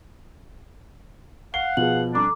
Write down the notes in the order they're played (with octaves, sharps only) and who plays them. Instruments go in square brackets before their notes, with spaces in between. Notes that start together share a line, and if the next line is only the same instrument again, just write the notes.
[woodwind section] F5 F#5 [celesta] C7 [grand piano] G7
[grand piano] B2 F3 [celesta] G#4 B4 F#7
[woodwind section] G3 C4 D4 [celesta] A4 A#5 D6